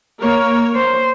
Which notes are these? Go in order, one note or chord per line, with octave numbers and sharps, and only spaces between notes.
A#3 A#4 C#5
C5